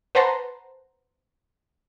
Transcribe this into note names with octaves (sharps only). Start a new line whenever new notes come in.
B4 C5 F#5 A5 A#5 C6